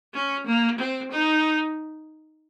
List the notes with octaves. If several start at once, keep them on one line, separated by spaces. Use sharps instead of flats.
C#4
A#3
C4
D#4